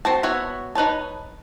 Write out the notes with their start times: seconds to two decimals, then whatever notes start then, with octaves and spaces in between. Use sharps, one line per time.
0.05 C4 F#4 A5
0.23 B3 F#4 C#5 E5
0.75 D#4 B4 C#5 A5